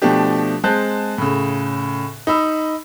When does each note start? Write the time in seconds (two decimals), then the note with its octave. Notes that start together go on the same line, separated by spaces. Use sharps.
0.02 B2 F3 A3 D4 G4
0.64 G#3 C4 A5 F#6 G6
1.18 A2 C#3
2.27 D#4 B5 E6